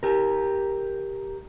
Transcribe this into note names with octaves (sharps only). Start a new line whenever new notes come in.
G4 A#4